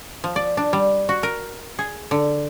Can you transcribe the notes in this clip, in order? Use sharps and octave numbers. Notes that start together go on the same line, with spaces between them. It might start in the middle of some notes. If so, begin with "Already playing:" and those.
F3
D5
D4
G3
F#4
A#4
G#4
D3